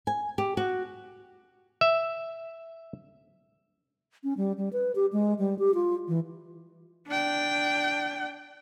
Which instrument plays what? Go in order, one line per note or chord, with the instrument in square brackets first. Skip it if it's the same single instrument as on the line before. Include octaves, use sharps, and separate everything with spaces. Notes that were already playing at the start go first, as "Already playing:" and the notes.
[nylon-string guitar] G#5
G4
F#4
[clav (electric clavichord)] E5
[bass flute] C#4
G3
G3
B4
G4
G#3
G3
G4
F4
E3
[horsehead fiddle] D4 G5